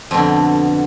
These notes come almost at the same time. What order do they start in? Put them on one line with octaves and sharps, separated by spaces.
F2 B2 D3